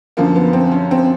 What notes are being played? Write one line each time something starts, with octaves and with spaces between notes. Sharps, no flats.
F#2 D3 F3 A#3
B3
C4
C#4
C4